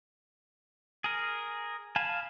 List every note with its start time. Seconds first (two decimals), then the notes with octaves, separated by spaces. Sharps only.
1.04 G#4 A#4
1.96 F5 G#5 A5 B5